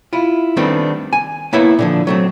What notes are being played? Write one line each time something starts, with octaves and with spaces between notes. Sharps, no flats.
E4 F4
D#3 G3 A3 B3 C4 D4
G#5
A#3 B3 E4 C#5 E5
A#2 D3 F3
F#3 A3 C4